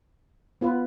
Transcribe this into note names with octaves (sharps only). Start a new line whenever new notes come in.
B3 F4 B4